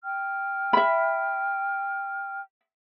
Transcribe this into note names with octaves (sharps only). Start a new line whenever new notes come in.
G5 F6
E5 B5